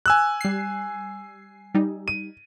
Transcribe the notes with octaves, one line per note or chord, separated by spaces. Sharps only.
G#5 E6 F#6
G3 C7
G3 D#4
D#7